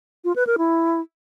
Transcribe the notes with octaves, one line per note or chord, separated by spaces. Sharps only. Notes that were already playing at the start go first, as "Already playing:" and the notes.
F4
B4
A#4
E4